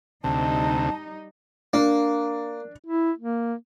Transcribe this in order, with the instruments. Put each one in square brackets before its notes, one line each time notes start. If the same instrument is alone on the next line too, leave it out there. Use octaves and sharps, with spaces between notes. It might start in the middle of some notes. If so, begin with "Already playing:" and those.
[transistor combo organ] D2 C3 [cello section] G3 D#4 [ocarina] A5
[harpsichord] A#3 [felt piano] D4
[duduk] E4
A#3